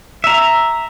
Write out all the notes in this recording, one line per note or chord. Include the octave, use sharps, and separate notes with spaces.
E5 A#5